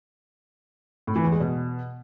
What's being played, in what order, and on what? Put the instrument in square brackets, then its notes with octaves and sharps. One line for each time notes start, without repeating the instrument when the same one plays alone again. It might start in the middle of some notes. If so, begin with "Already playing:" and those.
[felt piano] A2
E3
E2
G#3
B2